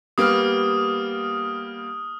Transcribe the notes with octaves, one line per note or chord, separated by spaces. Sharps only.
G3 A#3 B3 D#6 F6